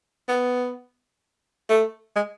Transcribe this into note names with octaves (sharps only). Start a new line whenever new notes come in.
B3
A3
G#3